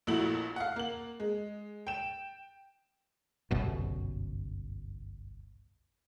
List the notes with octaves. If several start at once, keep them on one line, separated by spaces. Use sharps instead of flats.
A#1 A#2 A3 E4 F#4 F#7
F5 F#5
A#3 F#7
G#3
G5 E7
G1 C2 F#2 B2